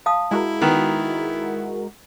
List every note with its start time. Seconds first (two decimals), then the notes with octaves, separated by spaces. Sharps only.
0.06 F5 A5 D#6
0.31 G#3 E4 F#4 A#4
0.61 D#3 B3